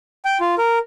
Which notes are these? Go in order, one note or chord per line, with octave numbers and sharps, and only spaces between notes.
G5
F4
A#4